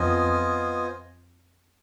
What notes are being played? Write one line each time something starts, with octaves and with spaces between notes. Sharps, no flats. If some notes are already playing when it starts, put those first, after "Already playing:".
Already playing: F2 B3 F4 C5 D#5 G#5